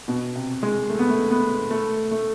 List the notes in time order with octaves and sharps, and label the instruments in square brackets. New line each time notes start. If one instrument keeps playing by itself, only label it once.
[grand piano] B2
C3
G#3
A3
B3
A3
B3
A3
A3